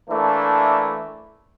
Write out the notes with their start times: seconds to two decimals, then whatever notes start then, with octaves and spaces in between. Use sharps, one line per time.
0.10 E3 A3 A#3 D4